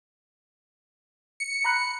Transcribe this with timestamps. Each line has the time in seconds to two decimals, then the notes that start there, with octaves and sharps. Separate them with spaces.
1.40 C#7
1.65 A#5 B5 F#6